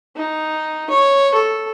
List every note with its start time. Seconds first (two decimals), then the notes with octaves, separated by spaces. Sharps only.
0.17 D#4
0.90 C#5
1.34 A4